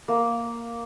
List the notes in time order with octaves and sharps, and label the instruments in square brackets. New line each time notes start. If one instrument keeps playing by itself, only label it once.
[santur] A#3